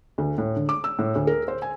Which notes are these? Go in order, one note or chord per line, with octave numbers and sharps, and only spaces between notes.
D2
A2
D3
D6
E6
A2
D2
A#4
C5
G#5